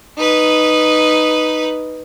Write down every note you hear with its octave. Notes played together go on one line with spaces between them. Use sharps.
D#4 B4